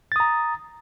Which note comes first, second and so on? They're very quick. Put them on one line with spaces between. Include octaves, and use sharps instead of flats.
A6 D#6 A#5